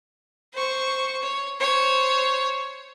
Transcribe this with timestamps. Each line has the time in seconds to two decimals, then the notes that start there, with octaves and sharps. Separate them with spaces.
0.53 C5 C#6
1.22 C#5
1.60 C5 C#5